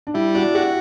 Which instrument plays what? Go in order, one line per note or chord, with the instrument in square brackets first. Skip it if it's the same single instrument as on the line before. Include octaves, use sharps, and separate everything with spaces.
[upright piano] D4
[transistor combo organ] G3 [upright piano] E4
[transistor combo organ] D4 [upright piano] F#4
[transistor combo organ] F#4 [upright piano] G4